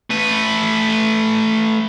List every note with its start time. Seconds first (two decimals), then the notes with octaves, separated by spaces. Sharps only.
0.10 A3 B4